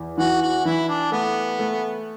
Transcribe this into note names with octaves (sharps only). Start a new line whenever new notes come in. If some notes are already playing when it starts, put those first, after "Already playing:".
Already playing: E2
E3 F#4
F#4
E3 E4
D4
A3 B3
A3